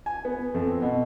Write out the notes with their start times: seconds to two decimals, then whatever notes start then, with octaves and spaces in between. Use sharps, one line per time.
0.06 G#5
0.25 B3
0.54 F2
0.67 C4
0.82 B2